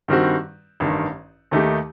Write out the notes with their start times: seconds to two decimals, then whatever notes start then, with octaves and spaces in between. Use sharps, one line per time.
0.08 G2 D#3 G3 C4 F#4
0.80 A1 G2 D#3
1.51 D#2 D#3 A3 D#4 G4